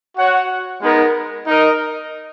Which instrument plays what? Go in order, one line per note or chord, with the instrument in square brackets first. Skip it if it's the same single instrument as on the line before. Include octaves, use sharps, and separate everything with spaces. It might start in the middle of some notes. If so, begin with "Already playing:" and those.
[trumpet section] F#4 C#5 F#5
G#3 B3 D#4 A#4
D#4 A#4 D#5